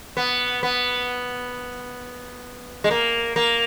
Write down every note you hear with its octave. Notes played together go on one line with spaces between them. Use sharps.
B3
B3
G#3
A#3
A#3